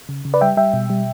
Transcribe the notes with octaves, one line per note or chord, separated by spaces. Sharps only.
C#3
C#3
B4 D5
G3 E5 G5
G3 E5 G5
B2
G3